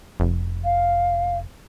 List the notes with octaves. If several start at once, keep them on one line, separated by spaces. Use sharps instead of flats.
F1
F5